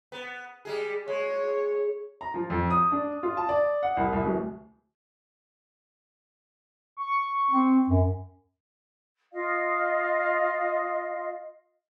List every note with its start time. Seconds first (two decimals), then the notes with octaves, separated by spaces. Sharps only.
0.12 B3
0.65 G3 G#3 G#4
1.08 G#3 C#5
2.21 A#5
2.34 F3
2.50 F2
2.70 D#6
2.92 D4
3.23 F4
3.37 A5
3.49 D5
3.83 F#5
3.97 C2
4.13 C2
4.25 D1
6.97 C#6
7.51 C4
7.89 F#2
9.32 F4 D#5 F5